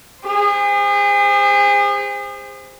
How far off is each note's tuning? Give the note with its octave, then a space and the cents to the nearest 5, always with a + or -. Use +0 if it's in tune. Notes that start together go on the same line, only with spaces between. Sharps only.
G#4 -40 C5 +0